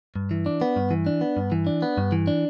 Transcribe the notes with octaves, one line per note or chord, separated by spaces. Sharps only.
G2
E3
D4
B3
G2
E3
D4
B3
G2
E3
D4
B3
G2
E3
D4